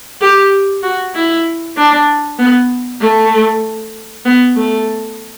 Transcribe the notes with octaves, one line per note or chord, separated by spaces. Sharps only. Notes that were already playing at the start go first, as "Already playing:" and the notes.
G4
F#4
E4
D4
B3
A3
B3
A3